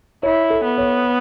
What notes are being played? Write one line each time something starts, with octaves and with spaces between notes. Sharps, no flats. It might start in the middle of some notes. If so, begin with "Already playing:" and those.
E4 C#5
A4
B3
C#5